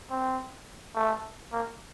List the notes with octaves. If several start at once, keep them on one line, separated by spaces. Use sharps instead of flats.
C4
A3
A#3